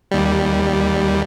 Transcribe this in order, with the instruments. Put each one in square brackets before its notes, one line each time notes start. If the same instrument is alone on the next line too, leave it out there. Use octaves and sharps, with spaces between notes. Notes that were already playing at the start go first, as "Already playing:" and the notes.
[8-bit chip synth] D#2 G3